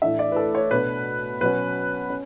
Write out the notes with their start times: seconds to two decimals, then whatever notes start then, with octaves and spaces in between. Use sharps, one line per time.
0.02 A2 E3 A3 D4 E5
0.19 D5
0.32 B4
0.36 A4
0.55 C#5
0.71 B2 A3 D4 B4
1.41 B2 F#3 C#4 B4
2.10 C#4